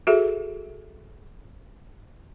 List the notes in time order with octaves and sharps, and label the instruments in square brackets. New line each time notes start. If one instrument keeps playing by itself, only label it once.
[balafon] F#4 G#4 A4 E5